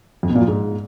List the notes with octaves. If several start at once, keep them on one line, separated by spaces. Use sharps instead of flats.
F2
B2
A#2
F3
G#2